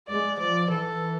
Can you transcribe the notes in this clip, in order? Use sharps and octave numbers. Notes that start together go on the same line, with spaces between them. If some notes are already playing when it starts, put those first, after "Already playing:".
G#3 D5
F3 D5
E3 A4